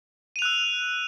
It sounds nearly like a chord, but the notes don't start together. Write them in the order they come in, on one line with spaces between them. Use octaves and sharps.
D#7 F7 F#6 E6